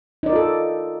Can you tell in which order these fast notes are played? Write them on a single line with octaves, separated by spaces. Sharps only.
D#4 D5 A#4 F4 A4